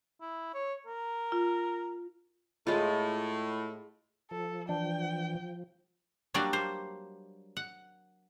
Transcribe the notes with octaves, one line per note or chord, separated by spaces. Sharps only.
E4
C#5
A#4
F4
A2 G#3 F4
F3 A4
E3 D4 G5
F#3 G3 A#3 D4 F#4 D5
A#3 C5
F#5